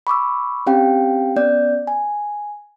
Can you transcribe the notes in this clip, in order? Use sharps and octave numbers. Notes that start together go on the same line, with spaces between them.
B5 C#6 D6 E6
C4 C#4 G4 F5 G5
B3 C#4 D5 G6
G#5